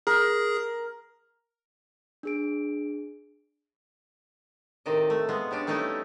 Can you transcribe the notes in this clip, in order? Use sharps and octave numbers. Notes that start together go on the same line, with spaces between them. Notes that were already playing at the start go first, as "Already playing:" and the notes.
G#4 A#4
D4 G#4 D7
A2 C3 D#3 D5 D#5
A3
G#3 B3 F4
G3 C#4 D4 D5
G3 A3 C#4 D#4 E4